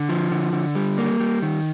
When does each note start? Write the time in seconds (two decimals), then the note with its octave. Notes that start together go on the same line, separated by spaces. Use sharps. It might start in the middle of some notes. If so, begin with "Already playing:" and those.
Already playing: D3
0.09 F3
0.32 D3
0.53 D3
0.75 G3
0.98 A#3
1.20 G3
1.42 D#3